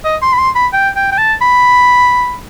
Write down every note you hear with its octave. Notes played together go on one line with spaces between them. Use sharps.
D#5
C6
B5
C6
B5
G5
G5
G5
A5
B5